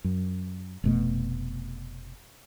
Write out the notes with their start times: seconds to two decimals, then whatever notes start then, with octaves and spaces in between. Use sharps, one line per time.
0.04 F#2
0.84 F1 B2 A3